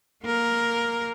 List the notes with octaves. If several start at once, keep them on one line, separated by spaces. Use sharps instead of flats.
A#3 A#4